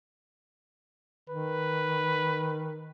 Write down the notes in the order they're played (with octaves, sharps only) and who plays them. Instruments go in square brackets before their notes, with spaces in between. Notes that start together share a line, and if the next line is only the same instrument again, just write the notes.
[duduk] D#3 [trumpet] B4